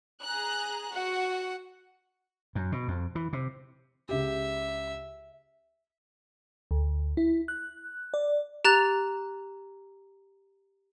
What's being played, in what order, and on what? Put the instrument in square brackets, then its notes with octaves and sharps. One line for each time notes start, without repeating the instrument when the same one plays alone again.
[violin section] G#4 A#5 F#6
[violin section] F#4 [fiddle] F#5
[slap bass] F#2
B2
F2
E3
C3
[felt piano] C#2 G4 [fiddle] E5
[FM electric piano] D2
E4
F#6
D5
[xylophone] G4 A#5 F#6 A6 F7